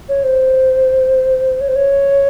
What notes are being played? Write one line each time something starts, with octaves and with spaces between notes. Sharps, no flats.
C#5
C5
C#5
C5
C#5